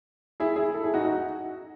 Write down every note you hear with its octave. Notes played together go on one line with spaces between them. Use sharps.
E4 G#4
E4 G#4
A4
E4 G#4
D#4 F#4
D#4 F#4